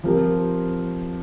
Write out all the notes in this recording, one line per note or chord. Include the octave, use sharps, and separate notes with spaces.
F3 C4 G4 A#4